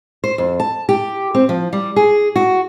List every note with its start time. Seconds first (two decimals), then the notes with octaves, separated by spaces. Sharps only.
0.24 C5
0.38 F2
0.60 A5
0.89 G4
1.35 C4
1.49 F3
1.73 G3
1.96 G#4
2.36 F#4